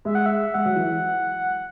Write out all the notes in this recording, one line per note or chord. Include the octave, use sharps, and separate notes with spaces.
G#3 E5
F#5
E5
G#3 F#5
F#3
E3